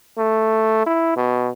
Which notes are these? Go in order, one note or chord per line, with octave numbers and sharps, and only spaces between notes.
A3
E4
B2